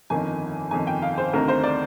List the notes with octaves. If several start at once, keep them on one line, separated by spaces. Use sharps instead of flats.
G1 F2 D#3 G#5
G1 F2 D#3 G#5
G5
F5
C5
D2 C3 D#3 A#4
C5
D5